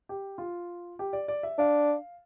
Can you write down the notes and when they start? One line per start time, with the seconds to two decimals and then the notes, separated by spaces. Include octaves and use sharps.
0.09 G4
0.38 F4
0.99 G4
1.13 D5
1.28 D5
1.43 E5
1.58 D4 F5